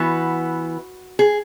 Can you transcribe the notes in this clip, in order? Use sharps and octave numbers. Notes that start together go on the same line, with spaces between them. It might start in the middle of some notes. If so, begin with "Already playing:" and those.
Already playing: E3 B3 F#4
G#4